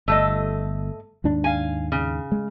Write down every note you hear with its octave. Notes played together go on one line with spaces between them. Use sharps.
G1 A3 A4 D#5
D#2 G#2 D4
F5 G#5
C#3
G#3